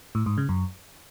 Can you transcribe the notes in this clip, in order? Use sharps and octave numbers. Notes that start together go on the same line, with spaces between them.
A2
G#2
C#3
F#2